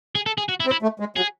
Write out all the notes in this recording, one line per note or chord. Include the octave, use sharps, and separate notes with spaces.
G#4
A4
G#4
F#4
E4
C4
E4
A3
G#3
F#3 G#4